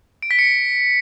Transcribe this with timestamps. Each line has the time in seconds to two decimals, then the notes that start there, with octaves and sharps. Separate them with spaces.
0.22 D7
0.31 B6
0.39 C#7